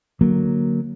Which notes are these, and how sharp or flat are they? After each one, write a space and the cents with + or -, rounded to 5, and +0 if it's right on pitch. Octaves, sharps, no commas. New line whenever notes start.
D3 +0 F#3 +0 A#3 +0